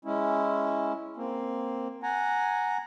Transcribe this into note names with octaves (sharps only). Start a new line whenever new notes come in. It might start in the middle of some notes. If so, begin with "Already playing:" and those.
G#3 C#4 E4
A#3 C4
F#5 G#5 A#5